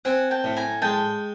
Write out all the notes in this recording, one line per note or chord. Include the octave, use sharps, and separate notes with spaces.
C4 F#5 G#5
G5 A5
A2
G#5 A#5
G#3 G5 A5